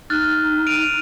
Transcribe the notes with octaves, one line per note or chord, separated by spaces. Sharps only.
D#4 F6 F#6 A6
D7 D#7 F7